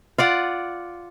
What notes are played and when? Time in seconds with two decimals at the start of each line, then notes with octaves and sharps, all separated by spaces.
0.18 F4 D5 F#5